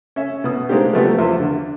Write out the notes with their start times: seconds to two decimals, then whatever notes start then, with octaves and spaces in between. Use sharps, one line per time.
0.16 C#4 E5
0.44 B2 D#6
0.69 G#3 A#3 C4 D4 D#4 G4
0.93 F3 F#3 A3 B3 C#4 G4
1.18 E2 F3 E5
1.40 D3